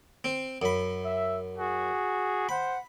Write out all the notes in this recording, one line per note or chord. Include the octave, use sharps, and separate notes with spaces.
C4
F#2 B5
E5
F#4 G#4
C5 F#5 B5